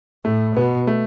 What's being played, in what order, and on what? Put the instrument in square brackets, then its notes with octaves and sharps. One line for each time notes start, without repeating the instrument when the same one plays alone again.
[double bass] A2 [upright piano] A3
[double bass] B2 [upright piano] B3
[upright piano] A3